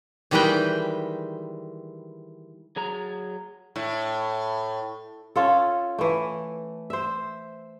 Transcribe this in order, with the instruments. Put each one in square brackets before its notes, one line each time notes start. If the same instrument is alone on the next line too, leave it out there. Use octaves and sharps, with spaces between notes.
[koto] D#3 E3 G3 G#3 B4 G5
[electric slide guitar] F#3 G#4 A#5
[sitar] A2
[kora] C#4 F4 A4
E3 A3
C5 E5